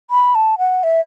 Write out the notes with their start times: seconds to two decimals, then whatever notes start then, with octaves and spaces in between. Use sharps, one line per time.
0.10 B5
0.35 A5
0.58 F#5
0.83 E5